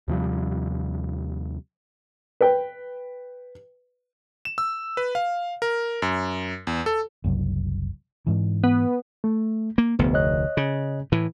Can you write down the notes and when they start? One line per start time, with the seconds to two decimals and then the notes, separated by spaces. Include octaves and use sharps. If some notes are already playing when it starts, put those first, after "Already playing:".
0.08 D#2 C3 F3 G3
2.41 B4 G5
4.45 E7
4.58 E6
4.97 B4
5.15 F5
5.62 A#4
6.02 F#2
6.67 E2
6.86 A4
7.24 F#1 C2 F#3
8.27 G#2 E3
8.64 B3
9.24 A3
9.78 A#3
9.99 F1 D2 B3
10.14 C#5 D#5 F#6
10.57 C#3
11.12 A2 E3